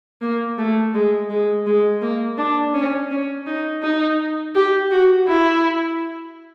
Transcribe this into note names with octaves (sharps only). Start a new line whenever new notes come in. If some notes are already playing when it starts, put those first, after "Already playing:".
A#3
A3
G#3
G#3
G#3
A#3
D4
C#4
C#4
D#4
D#4
G4
F#4
E4